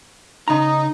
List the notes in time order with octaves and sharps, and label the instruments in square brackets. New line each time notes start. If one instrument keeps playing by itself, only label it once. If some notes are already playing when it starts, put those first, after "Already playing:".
[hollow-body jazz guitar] C#3 A#5 [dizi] D#4